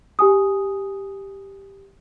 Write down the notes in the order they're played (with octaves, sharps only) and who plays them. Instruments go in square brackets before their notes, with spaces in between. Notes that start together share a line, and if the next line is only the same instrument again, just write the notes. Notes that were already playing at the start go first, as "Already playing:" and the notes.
[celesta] G4 G#5 D#6